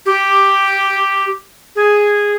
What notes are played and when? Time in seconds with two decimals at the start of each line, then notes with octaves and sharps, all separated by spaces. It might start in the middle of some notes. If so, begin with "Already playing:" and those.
0.06 G4
1.76 G#4